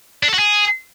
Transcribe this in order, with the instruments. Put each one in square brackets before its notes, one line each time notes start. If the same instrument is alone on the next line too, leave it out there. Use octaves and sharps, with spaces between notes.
[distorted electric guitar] D4
A4
F#4
G#4